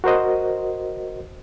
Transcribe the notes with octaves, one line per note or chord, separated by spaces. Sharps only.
F#4 A#4 C5 D#5